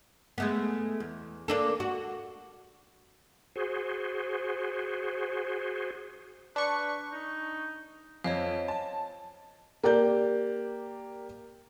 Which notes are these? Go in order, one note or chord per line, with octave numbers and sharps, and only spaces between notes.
G#3 A3 B3
E2
A#3 D4 A4
F#4
F#4 G#4 C5
D4 B4 C#6 C#7
D#4
F2 C#5 D#5 F5
A5
A#3 G4 D5 G6